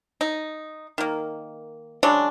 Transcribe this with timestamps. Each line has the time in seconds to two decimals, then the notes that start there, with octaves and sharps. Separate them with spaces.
0.21 D#4
0.98 D#3 A#3
2.03 C#3 F#3 G#3 D4